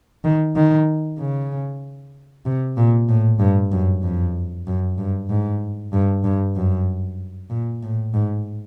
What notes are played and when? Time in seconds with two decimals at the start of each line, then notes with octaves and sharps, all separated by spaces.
0.24 D#3
0.56 D#3
1.19 C#3
2.45 C3
2.77 A#2
3.09 A2
3.39 G2
3.71 F#2
4.02 F2
4.67 F#2
4.98 G2
5.29 G#2
5.93 G2
6.24 G2
6.56 F#2
7.50 A#2
7.83 A2
8.14 G#2